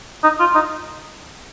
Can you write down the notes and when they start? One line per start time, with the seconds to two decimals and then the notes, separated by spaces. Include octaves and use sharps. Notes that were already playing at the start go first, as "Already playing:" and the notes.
0.23 D#4
0.40 F4
0.55 D#4